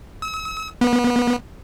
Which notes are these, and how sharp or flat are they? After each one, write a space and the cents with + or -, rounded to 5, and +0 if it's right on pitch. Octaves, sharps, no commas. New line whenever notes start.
E6 -45
B3 -30